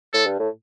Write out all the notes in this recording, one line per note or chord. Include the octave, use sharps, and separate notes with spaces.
A2 A4
G2
A2